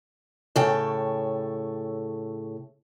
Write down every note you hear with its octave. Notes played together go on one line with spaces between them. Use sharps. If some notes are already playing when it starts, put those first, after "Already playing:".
A2 C#3 A4 C#5 G5